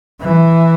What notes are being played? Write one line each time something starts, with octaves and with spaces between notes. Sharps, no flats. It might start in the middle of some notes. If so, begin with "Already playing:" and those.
E3